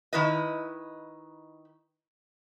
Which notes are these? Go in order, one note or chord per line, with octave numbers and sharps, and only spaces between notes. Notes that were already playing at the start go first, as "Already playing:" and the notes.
D#3 E4 B4 D#5